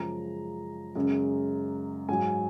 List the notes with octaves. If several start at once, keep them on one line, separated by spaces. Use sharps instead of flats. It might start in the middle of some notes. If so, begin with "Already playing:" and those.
Already playing: F#2 C#3 F3 G#3 A#5
F#2 C#3 G#3
G#2 F#3 G#5